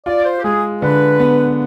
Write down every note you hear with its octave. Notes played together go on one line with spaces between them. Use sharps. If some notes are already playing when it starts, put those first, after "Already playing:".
F4 D5
C5
G4
G#3 G#4
D3 B4
B3